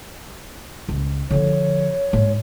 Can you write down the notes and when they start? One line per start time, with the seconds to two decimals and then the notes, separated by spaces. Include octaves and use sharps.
0.88 C#2
1.31 D3 F3 C#5
2.13 G#2